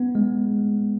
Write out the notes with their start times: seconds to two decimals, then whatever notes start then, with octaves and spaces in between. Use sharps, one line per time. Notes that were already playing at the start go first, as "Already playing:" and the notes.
Already playing: B3
0.15 G#3